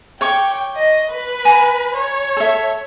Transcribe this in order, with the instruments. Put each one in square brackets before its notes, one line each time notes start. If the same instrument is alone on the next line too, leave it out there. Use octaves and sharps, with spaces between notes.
[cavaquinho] C#5 C#6 D6 [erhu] G5
[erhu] D#5
B4
[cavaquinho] G#5 A#5 B5
[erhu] C#5
[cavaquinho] A4 E5